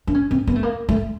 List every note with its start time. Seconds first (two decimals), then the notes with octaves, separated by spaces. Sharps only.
0.07 D4
0.15 C#4
0.31 C4
0.47 B3
0.56 A3
0.63 A#3
0.89 A3